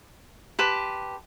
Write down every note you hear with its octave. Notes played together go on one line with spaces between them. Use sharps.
G4 B4 A5 C6